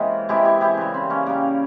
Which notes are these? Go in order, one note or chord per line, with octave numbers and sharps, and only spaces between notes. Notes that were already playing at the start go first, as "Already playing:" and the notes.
Already playing: C3 E3 G#3 A#3 C#4
C3 E3 G#3 E4 G4
E4 G4
E4 G4
C#3 G3
C4
A#3 C#4
C#3 G3 A#3